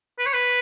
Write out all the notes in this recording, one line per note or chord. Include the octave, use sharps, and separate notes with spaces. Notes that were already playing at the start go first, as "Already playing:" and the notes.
B4
C#5
B4